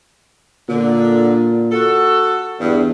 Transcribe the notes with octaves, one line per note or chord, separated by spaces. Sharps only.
A#2 D3
F#4 A4
E2 G2